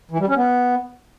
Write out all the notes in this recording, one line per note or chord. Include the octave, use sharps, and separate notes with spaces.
E3
G3
C#4
B3